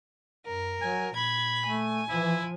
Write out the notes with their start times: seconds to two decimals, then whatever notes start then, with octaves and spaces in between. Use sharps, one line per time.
0.46 F#2 A#4
0.81 F#3 G#5
1.16 A#2 B5 G#6
1.66 A3 G#5
2.09 E3 F3 E4